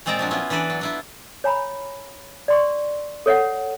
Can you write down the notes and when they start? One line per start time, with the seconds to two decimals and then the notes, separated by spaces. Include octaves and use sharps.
0.06 A#2 G#3 C4 F4 D5 A#5
0.19 F3 F#3 D4
0.31 B3 C#4 E4 F4
0.50 E3 D4 A4 B4 D5
0.70 F#3
0.81 D4 E4 F4
1.44 C#5 G#5 A#5 B5
2.48 D5 C6 C#6
3.26 A4 C#5 E5 F#5